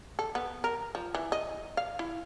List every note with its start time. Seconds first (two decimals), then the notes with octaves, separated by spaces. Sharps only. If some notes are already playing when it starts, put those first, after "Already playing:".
0.19 A4
0.35 B3
0.64 A#4
0.95 F3
1.15 E3
1.32 D#5
1.77 F5
1.99 E4